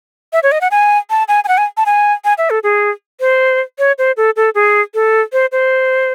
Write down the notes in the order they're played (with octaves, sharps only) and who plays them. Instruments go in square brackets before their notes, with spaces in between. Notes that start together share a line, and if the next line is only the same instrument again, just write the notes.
[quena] E5
C#5
D#5
F#5
G#5
A5
G#5
G#5
F#5
G#5
A5
G#5
G#5
E5
A4
G#4
C5
C#5
C5
A4
A4
G#4
A4
C5
C5